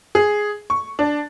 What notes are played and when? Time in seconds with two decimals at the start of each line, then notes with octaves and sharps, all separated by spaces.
0.15 G#4
0.70 C#6
0.99 D4